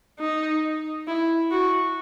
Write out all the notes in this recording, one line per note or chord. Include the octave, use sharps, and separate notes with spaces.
D#4
E4
F#4